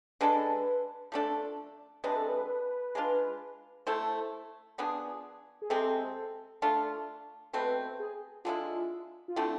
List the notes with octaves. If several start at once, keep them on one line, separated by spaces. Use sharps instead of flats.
D3 G#3 D4 A4 B4
F3 A3 D4 A4
C3 F3 G#3 D4 B4
A4
B4
G#3 D4 F4
A3 E4 A4 C5
F3 B3 D4 G#4
G#4
C3 G#3 C4 A4
A3 D4 F4
B2 A3 C4 B4
G#4
D3 G#3 B3 E4 F4
F4
D3 A3 C4 E4